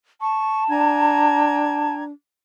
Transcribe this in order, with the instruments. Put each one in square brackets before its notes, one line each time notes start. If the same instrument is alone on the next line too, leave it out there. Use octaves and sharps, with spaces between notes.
[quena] A5 [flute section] C#6
[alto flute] D4 [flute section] G5 A#5 G#6